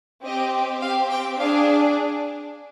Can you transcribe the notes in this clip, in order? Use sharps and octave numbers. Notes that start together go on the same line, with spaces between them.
C4 G4 D#5
C4 G4 F5
G5
D4 G#4 F5